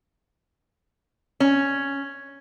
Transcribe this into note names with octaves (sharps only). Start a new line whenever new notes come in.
C#4